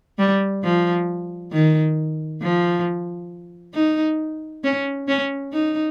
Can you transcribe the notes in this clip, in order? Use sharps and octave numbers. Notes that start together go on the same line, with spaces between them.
G3
F3
D#3
F3
D#4
C#4
C#4
D#4